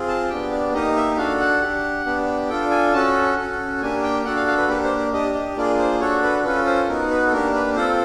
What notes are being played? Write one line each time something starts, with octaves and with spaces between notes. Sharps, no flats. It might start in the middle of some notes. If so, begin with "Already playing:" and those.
Already playing: C4 F4 G#4
A5
B3 D4 G4 G5
D5
A#3 D#4 G4 D#5
E5
D4 F#4 A4 F5
F#5
D4 G4
B3 D4 G4
D4 F4 A4 G5
G#5
C#4 F#4 A4 A5
C#4 F#4 A4
A#3 D4 G4 G#5
G5
D4 F#4 A4 F#5
F5
F5
B4
A#3 D4 G4 B4
C5
D5
D4 G4 D#5
D#5
A#3 D4 F4 G#4 D5
C5
D4 F#4 A4 C#5
B4
C#4 F4 A4 B4
C5
B3 D#4 F#4 A#4
B4
A4
A#3 D4 G4 A#4
B4
C4 F4 A4 C5